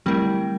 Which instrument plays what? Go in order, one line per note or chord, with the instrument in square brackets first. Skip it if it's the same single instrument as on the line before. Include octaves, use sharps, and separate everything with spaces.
[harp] G3 [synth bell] A3 C4 E4 A#4